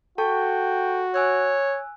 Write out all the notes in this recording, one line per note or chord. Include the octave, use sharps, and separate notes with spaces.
F#4 A4 G5 A5 C#6
C#5 G#5 E6 F#6